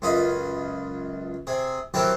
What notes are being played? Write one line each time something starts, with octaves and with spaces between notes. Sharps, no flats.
C#2 F#2 F4 D#5 B5
C3 G#4
E3 F#3 C4 G4 A4 A#4